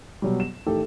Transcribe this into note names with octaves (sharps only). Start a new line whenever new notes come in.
B2 F#3 G3
E7
A1 D#3 G4 A4